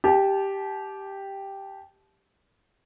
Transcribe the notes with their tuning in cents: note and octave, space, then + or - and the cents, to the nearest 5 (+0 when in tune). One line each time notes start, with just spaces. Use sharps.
G4 +0 A5 -30